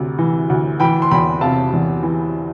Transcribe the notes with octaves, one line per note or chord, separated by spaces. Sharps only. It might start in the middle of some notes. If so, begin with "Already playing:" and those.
Already playing: D2 C3
E3
D2
E3 G5 B5
C6
E2 G5 B5
C3 F5 A5
E2
E3